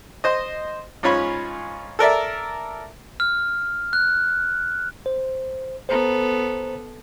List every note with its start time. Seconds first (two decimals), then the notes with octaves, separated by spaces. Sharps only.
0.24 C5 D#5
1.03 G#2 C#4 F4 C#5 B5
1.99 A4 A#4 D5 E5
3.20 F6
3.93 F#6
5.06 C5
5.89 B3 A4 C5 A#5